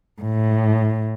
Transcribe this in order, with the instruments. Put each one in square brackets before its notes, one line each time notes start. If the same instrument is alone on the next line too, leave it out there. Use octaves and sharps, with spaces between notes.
[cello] A2